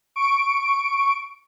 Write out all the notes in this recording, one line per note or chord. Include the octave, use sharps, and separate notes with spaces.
C#6 D7